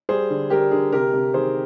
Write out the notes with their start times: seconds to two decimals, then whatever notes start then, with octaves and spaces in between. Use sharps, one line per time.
0.09 G3 G#4 C5
0.30 D3
0.50 G3 G4 A#4
0.72 D3 G#4
0.92 C3 G4 A#4
1.14 C3
1.34 D#3 G#4 C5